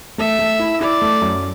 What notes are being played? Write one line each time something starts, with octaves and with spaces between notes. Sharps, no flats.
A3 E5
A3
E4
E4 D5
A3
F#2